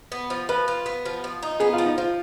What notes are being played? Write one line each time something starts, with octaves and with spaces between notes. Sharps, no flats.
B3
F3
F3 B4
F4
B3
F3
F3
D#4
B3 G#4
F4
F3
D#4
F3 F4